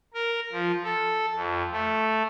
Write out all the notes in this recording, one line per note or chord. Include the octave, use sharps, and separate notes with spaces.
A#4
F3
A4
F2
A3